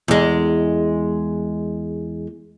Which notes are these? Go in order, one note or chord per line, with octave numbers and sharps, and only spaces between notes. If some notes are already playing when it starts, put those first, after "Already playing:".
E2 G#3